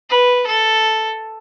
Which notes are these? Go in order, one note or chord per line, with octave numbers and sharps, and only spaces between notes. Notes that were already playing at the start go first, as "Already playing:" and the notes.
B4
A4